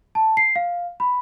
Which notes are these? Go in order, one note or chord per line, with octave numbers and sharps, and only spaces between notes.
A5
C7
F5
B5